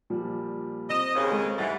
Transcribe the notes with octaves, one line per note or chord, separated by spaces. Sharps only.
A#2 F3 G3
C4 D#5 E7
D#2 C#3
G#3 C4 A4
G#2 E3 G3 F#5 A6